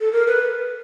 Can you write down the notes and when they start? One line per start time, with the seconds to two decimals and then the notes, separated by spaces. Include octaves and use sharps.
0.01 A4
0.13 A#4
0.27 B4